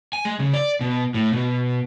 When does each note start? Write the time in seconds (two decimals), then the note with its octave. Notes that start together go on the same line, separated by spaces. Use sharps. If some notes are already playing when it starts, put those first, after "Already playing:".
0.13 G#5
0.25 G#3
0.40 C#3
0.53 D5
0.81 B2
1.14 A2
1.32 B2